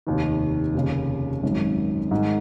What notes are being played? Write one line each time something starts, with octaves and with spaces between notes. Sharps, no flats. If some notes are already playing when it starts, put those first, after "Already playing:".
F1 D#2 D#3
F1 D#2 C#3
G#1 F#2 D#3
G#2 D#3 G#3